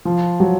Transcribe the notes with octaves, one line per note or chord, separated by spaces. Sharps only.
F3
F#3